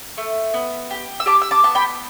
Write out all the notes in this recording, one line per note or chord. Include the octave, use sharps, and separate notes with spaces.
A3
B3
G4
E6
G4 A5 D6
E6
A5 D6
B3 A5
G5 B5